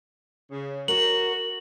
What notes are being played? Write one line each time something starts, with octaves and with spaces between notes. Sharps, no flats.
C#3
F#4 A#4 C#5 F#7